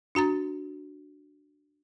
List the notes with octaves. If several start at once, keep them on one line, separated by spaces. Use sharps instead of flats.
D4 F#4 A#5 A6